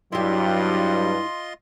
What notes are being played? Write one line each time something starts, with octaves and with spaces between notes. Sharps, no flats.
G2 F#3 E4 F4 G4 D#5 C6